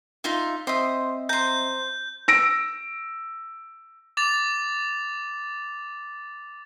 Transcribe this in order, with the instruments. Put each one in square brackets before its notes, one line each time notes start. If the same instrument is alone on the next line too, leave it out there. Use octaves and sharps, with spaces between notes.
[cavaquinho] D#4 F4 E5
[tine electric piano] C4 D#5 E5 [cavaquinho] C5 D#6
[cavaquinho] C5 A#5 [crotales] G6
[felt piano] E6 A#6 D7
[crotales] D6 A6 F7